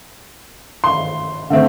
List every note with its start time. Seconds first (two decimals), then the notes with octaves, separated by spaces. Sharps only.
0.84 C6
1.50 D3 A3 C4